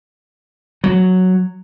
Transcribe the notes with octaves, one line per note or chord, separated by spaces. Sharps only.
F#3